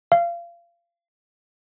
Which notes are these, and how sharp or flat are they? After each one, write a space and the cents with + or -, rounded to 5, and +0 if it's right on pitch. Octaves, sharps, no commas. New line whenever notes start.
F5 -25